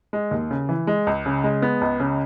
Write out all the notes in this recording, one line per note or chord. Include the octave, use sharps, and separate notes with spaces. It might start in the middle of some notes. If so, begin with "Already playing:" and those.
G#3
D#2
C#3
E3
G#3
C#2
C#3
G#3
B3
C#2
C#3